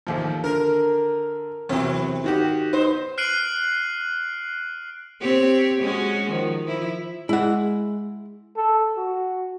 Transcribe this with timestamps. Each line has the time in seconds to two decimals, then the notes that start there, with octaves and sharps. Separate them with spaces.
0.07 A1 D#2 F3
0.44 D3 A#4
1.69 E2 C3 F#3 C4 E4
2.24 D#3 F#4 G4
2.73 B3 D#4 C5
3.18 F6 F#6 C7 D7 D#7 F#7
5.21 C4 G4 C#5
5.81 G#3 C#4 F#4
6.30 D#3 F3
6.66 F3 E4
7.29 G#3 E4 F#5
8.57 A4
8.97 F#4